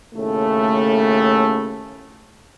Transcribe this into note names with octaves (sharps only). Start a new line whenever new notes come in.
D#2 A2 C#3 A3